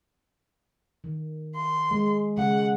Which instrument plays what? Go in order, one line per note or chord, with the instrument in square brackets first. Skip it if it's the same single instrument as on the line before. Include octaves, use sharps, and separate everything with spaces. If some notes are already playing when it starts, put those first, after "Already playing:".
[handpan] D#3
[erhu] C6
[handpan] G#3
[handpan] C#3 G#3 [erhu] F#5